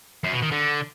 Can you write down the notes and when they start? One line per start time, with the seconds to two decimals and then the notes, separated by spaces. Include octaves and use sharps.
0.24 F#2
0.33 B2
0.42 D#3
0.51 D3